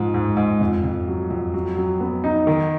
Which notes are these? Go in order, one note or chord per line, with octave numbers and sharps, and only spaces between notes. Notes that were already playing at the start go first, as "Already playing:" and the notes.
Already playing: G#2 F3
G#2
G#2
F2
F2
F#3
F2
F#3
F#3
B3
D#4
D#3